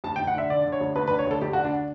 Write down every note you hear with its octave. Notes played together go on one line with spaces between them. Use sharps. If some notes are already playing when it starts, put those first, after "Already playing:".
D2 A5
G5
D2
F#5
D3 E5
D3 D5
D3
C#5
D2
D2 B4
B4
D3
C#5
D2 A4
D2 G4
F#4
D3
D4